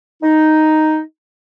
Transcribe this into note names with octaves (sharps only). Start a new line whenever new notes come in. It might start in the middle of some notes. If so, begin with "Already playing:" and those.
D#4